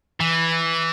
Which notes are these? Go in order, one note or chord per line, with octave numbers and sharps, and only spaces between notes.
E3